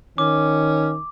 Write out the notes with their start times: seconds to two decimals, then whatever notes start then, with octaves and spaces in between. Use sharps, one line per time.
0.18 D#3 C#4 D6